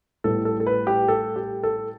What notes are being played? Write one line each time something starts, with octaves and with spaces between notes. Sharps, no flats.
A2 G3 B3 A4
A4
A4
B4
G4
A4
G4
A4